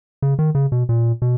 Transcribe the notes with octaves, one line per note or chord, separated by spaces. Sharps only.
C#3
D#3
C#3
B2
A#2
B2